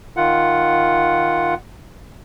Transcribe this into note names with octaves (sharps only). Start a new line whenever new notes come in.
D#3 F4 F#5